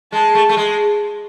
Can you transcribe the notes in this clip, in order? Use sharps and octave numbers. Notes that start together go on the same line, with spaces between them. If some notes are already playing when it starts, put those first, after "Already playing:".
G#3 A5
A3
A3
G#3